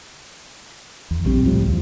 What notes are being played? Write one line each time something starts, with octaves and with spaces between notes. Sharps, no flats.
E2
A#1 G3 C4
C#2 A2 F3 G3
E2 F3